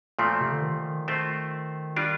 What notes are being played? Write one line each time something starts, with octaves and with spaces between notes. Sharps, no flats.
A#2 F3 A3 C4
C3
D3
D#3
A3 C4 F4 C5
G3 D4 F4 A#4